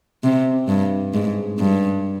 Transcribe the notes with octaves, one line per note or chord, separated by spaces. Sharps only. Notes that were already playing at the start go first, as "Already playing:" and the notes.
C3
G2
G#2
G2